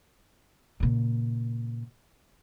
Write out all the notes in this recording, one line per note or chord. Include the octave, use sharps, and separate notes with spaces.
A#2 C#3